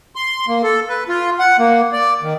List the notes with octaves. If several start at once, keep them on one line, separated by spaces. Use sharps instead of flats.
C6
A#3
A4
B4
F4
F#5
A#3
D5
D#3